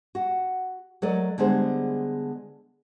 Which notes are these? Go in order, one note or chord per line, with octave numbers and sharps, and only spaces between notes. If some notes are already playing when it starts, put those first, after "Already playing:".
F#4 F#5
F#3 A3 A4 A#4 D5 D#5
D3 G3 G#3 B3 G#4 C5